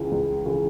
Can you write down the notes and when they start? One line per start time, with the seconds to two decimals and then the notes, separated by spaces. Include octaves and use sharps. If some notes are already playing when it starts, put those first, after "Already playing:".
Already playing: C#2 C#3 E3
0.12 C#2
0.46 C#3 E3